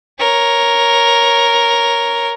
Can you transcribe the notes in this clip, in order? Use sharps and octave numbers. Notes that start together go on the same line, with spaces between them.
A#4 C#5